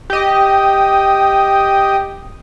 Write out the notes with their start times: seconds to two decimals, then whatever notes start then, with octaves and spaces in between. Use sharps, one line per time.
0.10 G4 D#5